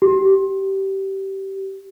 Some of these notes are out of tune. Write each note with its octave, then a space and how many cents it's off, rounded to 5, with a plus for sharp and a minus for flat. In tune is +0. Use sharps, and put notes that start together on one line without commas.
G4 -20